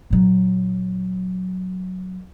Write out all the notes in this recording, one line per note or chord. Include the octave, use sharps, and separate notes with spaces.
A#2 F#3